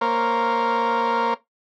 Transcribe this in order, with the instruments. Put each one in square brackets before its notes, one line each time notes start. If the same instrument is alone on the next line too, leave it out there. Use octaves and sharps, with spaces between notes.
[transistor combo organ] A#3 A#4 C5 C#5 F5